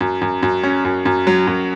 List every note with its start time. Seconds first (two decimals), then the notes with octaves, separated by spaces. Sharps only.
0.01 F#2
0.21 F#2
0.43 F#2
0.63 C#4
0.85 F#2
1.05 F#2
1.27 F#3
1.47 F#2